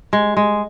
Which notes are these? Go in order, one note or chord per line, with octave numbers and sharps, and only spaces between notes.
G#3
G#3